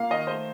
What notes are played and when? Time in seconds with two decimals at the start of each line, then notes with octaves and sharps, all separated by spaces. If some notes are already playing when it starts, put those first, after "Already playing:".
Already playing: A#2 A#3 F5
0.10 D#3 D#5
0.27 A3 C5